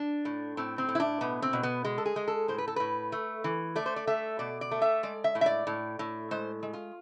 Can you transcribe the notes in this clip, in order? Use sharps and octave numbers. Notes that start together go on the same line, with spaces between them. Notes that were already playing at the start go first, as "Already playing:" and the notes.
Already playing: D4
A2
A2 C4
C4
A2
E4
D4
B2 B3
C4
B2
B3
G#3
A4
G#4
G#3
A4
A2 C5
B4
A4
A2 B4
A3
E3
A3 D5
C5
D5
A3 E5
B2 D5
D5
A3
E5
G#3 D5
E5
A2
E5
D5
A2
A2
G#3 C5
G#3
F4